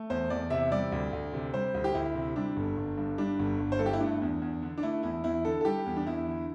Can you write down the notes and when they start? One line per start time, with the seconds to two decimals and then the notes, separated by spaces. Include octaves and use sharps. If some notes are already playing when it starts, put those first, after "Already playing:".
Already playing: A3
0.10 E2 C5
0.30 E2 D5
0.50 C3 E5
0.71 G3 D5
0.92 D2
1.13 D2
1.33 C3
1.54 G3 C5
1.74 D2
1.84 G4
1.94 D2 E4
2.15 C3
2.36 G3 D4
2.56 G1
2.77 G1
2.97 G2
3.18 G3 D4
3.39 G1
3.60 G1
3.72 C5
3.79 G2 A4
3.86 G4
3.93 E4
4.00 A3 D4
4.22 E2
4.42 E2
4.62 D3
4.78 D4
4.83 A3 E4
5.03 E2 E4
5.24 E2 E4
5.45 D3 A4
5.61 A4
5.65 G3 G4
5.86 E2
5.97 D4
6.06 E2 E4
6.27 D3